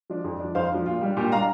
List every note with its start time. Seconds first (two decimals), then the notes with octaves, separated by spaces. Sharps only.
0.10 F3 D4
0.24 F2
0.40 F3 D4
0.55 F2 C5 F5
0.70 F3 D4
0.86 A#2 F4
1.01 G3 D4
1.17 A#2 G4
1.32 G3 D4 F5 A#5